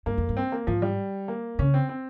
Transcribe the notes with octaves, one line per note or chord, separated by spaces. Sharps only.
G2 A#3
F2
G2
C4
A#3
G#2 F3
G3
A#3
C#3 C#4
C4
C4